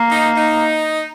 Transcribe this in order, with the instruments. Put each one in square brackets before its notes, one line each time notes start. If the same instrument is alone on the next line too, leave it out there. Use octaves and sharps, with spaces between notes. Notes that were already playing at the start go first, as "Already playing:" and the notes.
Already playing: [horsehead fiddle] A#3
[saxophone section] D#4
D#4